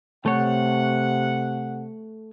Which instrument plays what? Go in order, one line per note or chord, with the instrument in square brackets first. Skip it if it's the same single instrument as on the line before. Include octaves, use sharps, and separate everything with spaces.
[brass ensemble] C3 F#5 [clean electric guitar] A3 C#5